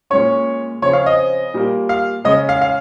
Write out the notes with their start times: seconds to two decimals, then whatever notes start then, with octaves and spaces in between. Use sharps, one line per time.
0.10 A#2 G#3 C#4 C#5
0.82 C#3 F3 C4 C#5
0.93 F5
1.06 D#5
1.54 A#2 G3 A#3
1.89 F5
2.25 C#3 G#3 C#4 D#5
2.49 F5
2.61 F5